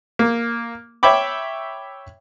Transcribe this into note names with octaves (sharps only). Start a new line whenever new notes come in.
A#3
C#5 E5 G5 B5 D6